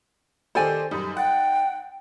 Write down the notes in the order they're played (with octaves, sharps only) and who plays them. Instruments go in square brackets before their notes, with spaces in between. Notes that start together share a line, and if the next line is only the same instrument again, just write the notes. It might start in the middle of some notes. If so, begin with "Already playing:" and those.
[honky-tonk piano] D#3 G4 C5 [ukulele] A4 D5 G#5
[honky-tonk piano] F#2 G3 [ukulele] D#4
[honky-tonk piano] F#5 A6 [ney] G5